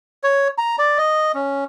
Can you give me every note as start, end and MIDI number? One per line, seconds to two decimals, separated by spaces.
0.23 0.48 73
0.58 0.76 82
0.79 0.98 74
0.98 1.32 75
1.34 1.64 61